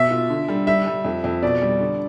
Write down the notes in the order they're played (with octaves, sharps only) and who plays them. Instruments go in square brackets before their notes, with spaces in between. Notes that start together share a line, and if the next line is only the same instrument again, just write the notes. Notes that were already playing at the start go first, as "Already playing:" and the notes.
Already playing: [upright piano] B2 [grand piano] E5
[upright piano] F4
D3
G3
[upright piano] G3 [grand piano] E5
[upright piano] G3
F2
F2
[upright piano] B2 [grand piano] D5
[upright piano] G3
D3